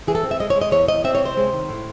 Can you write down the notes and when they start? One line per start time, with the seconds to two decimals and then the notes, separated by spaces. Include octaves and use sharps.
0.07 E3 G#4
0.15 A4
0.23 C4
0.31 E5
0.40 G#3 D#5
0.50 C#5
0.56 G#3
0.61 D#5
0.71 E2 C#5
0.88 E2 D#5
1.04 C4 E5
1.15 C#5
1.20 C3
1.25 C5
1.37 G#3
1.53 D#3
1.69 A2